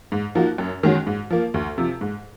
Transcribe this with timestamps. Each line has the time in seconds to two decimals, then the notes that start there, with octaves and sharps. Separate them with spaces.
0.12 G#2
0.35 F3 A#3 D#4 F#4
0.58 F#2
0.83 D#3 G#3 C#4 F#4
1.07 G#2
1.30 F3 A#3
1.54 D2
1.78 C3 F3
2.01 G#2